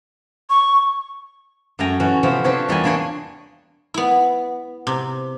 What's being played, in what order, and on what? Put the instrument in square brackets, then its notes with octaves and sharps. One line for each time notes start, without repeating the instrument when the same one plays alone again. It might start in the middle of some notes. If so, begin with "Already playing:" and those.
[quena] C#6
[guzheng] F#2 A3 G5 G#5 A#5
E3 C#4 F#4
C3 F3 B3 C4
F3 C4 D4 B4 C#5
E2 G3 A#3 G#5
G3 A#3 D4 E4 C#5 D#5
B3 E4
C3